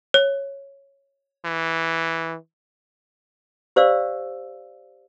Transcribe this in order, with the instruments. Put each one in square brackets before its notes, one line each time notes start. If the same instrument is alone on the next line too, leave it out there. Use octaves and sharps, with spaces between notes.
[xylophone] C#5
[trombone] E3
[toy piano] G4 C5 D5 F5 E6